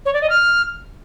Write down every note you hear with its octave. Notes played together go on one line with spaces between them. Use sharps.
C#5
D5
D#5
F6